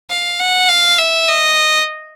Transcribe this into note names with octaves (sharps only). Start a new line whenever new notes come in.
F5
F#5
F5
E5
D#5